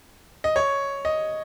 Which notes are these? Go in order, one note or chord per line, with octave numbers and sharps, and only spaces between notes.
D#5
C#5
D#5